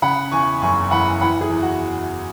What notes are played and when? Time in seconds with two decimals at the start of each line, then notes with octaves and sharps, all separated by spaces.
0.02 C#3 F#5 B5
0.32 E2 G#5 C#6
0.62 F#1 G#5 C#6
0.91 E3 F#5 B5
1.21 E3 F#5 B5
1.41 G#4
1.51 E2
1.62 F#4